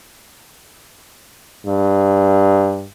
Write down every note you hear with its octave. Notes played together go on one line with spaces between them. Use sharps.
G2